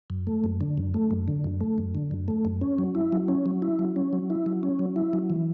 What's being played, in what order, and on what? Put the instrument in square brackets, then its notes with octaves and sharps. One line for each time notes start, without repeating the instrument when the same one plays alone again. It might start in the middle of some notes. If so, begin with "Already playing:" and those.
[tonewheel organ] F#2
A3
F#2
D3
F#2
A3
F#2
D3
F#2
A3
F#2
D3
F#2
A3
F#2
C#4
F#3
E4
F#3
C#4
F#3
E4
F#3
C#4
F#3
E4
F#3
C#4
F#3
E4
F#3
E3